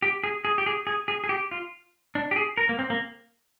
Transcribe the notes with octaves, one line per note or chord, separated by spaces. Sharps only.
G4
G#4
G#4
G4
G#4
G#4
G#4
G#4
G4
F4
D4
G4
G#4
A#4
A#3
C4
A#3